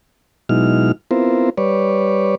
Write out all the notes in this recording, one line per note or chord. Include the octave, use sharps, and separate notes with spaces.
B2 F#3 G#3 D#4 E4 F6
B3 C4 E4 F4 A#4 C5
G3 B4 C#5 D5